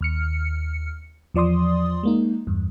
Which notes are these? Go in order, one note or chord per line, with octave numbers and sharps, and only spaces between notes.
D#2 F6 C#7
E2 F3 D5 C6 D#6
G#3 A#3 D#4
E2 G2